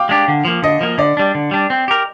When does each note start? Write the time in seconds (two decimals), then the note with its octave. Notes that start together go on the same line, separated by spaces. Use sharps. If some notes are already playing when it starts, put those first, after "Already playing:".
Already playing: F5 G5 D6
0.09 G#3 D4 G4
0.28 D3
0.45 F3 A#3
0.62 D3 D#5
0.81 F3 A#3
0.98 D3 D5
1.17 G3 D4
1.35 D3
1.51 G3 D4
1.70 C4
1.88 G4 A#4